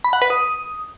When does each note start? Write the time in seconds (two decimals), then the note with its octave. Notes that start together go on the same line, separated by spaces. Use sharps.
0.04 B5
0.13 F#5
0.22 B4
0.30 D#6